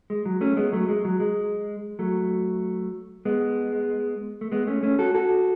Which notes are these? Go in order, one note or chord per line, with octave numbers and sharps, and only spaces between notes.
G#3
F#3
A3 C#4
G#3 B3
F#3 A3
G#3
F#3
G#3
F#3 A3
G#3 B3
A3
G#3 B3
A3 C#4
A3 C#4
F#4 A4
F#4 A4